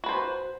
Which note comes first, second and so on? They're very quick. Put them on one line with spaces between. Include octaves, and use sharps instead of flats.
F#4 B4 C5